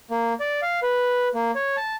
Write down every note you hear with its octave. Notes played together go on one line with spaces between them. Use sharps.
A#3
D5
F5
B4
A#3
C#5
A5